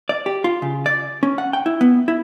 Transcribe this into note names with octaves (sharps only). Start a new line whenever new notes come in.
D5
G4
F4
C#3
D5
C#4
F#5
G5
E4
B3
E4